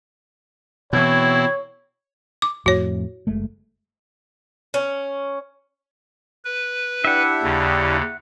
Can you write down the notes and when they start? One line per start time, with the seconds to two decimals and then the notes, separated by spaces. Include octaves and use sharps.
0.93 B2 E3 C4 E4 C#5 G#6
2.42 D6
2.66 F2 A2 F#4 C#5
3.27 F#1 G#3 A3
4.74 C#4
6.45 B4
7.05 D4 E4 G4 E5 F#5
7.43 D#2 C#3